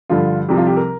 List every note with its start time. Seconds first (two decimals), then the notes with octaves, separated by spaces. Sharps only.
0.09 G2 D3 F3 F4
0.48 C2 C3 F3 G4
0.58 F4
0.67 G4
0.77 A#4